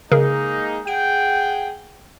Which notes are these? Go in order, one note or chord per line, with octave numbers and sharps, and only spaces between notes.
C#3 G#3 A#3 D#4 G#4 A#4
G#4 F#5 G5 D7